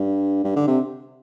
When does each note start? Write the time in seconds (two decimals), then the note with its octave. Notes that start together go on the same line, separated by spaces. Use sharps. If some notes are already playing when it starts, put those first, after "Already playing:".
Already playing: G2
0.44 G2
0.56 D3
0.67 C3